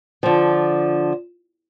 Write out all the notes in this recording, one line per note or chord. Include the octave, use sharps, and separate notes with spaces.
D3 F3